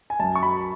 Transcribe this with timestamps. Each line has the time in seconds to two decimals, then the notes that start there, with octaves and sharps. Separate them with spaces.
0.10 G#5
0.20 F#2 A5
0.35 C#6
0.43 F#3 B5